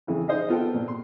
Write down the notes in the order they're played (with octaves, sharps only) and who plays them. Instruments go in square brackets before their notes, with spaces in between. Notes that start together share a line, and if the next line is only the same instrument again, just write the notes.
[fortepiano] F2 C#3 E3 G#3
D#4 G#4 C5 D#5 F5
B3 F4 A4 G5
A#2
C6